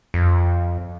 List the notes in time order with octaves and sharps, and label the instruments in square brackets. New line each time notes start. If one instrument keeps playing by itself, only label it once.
[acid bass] F2